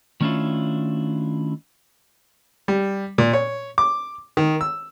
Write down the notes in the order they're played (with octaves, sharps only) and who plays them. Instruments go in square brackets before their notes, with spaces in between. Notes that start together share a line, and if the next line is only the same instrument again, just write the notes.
[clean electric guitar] D#3 A3 C#4 D4 E4 F4
[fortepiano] G3
A#2
C#5
D6
D#3
E6